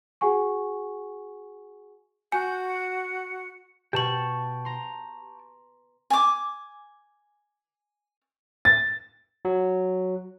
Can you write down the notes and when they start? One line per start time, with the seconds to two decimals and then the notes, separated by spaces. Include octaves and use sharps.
0.21 F#4 G#4 F#5 G#5 C#6
2.32 F#4 G#5 G6
2.69 C#7
3.93 B2 G4 G5 A5 C#6 F#7
4.65 A#5 C6
6.10 G#5 D6
8.65 A6
9.45 F#3